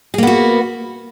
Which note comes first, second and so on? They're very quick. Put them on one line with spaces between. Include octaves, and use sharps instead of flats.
G#4 A#3 B3 F#4